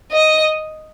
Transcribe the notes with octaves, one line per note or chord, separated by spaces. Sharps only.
D#5